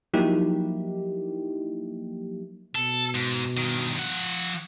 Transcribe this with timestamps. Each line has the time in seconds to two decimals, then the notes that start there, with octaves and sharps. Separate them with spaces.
0.13 F3 F#3 A#3 D#4 E4 G4
2.75 B2 A4
3.15 G#2
3.57 G2 D#3
3.99 F3 F#5